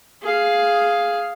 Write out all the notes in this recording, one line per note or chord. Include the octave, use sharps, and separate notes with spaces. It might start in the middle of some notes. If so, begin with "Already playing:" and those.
G#4 F5